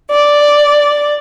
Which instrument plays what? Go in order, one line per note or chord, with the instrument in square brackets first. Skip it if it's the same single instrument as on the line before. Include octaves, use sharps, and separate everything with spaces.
[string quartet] D5